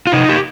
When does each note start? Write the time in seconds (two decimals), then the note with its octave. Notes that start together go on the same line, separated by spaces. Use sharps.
0.07 F4
0.12 C3 D#4
0.29 G4